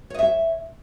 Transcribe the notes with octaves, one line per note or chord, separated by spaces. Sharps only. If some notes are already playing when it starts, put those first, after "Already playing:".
C#5 D#5 E5